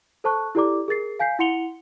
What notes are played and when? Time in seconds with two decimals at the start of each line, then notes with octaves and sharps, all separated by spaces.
0.24 A4 C5 A5 C#6 F#6
0.55 E4 G4 A4 D5 A#5 D6
0.88 G#4 A#4 A6 C7
1.19 F5 G#5 G6 B6 C7
1.39 E4 F#5 C6 C#7 F7 G7